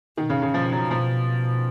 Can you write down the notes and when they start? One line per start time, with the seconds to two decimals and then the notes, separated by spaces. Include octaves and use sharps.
0.17 B2 D#3
0.30 C#3
0.42 C#3
0.54 B2 F3
0.72 F#3
0.91 B2 F3